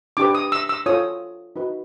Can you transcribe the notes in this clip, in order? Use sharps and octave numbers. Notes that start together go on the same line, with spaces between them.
D4 G4 B4 D6
D#6
E6
E6
F4 A4 C#5 D#6
D#4 F#4 B4